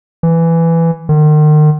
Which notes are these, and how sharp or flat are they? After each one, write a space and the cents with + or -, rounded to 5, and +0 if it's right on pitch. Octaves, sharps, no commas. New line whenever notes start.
E3 +10
D#3 -40